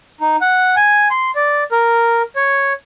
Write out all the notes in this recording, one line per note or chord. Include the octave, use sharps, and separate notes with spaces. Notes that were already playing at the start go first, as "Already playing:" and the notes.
D#4
F#5
G#5
C6
D5
A#4
C#5